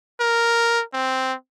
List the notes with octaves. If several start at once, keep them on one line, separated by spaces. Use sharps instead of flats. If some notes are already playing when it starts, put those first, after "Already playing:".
A#4
C4